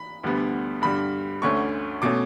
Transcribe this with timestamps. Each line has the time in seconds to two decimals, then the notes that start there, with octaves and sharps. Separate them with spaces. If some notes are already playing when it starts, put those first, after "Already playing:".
Already playing: B5
0.23 D2 D3 G3 B3
0.82 G2 D3 G3 B5
1.42 D2 D3 A3 C#4 C#6
2.02 B2 A3 C#4 D6